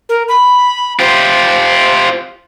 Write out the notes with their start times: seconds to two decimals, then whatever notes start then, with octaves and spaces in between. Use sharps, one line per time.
0.09 A#4
0.28 B5
0.99 F4 G4 C5